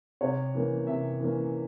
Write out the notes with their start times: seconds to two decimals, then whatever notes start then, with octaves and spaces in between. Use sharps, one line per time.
0.21 C3 C#5
0.54 E3 A#3 C#4
0.87 C3 E5
1.20 E3 A#3 C#4